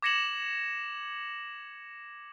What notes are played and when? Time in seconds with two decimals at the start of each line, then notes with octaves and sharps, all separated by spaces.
0.02 D6 G#6 A#6 C#7 E7 F#7